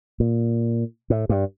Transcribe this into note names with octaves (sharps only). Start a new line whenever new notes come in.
A#2
A2
G2